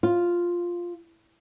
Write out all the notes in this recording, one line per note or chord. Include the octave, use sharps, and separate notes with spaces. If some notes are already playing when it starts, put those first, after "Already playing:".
F4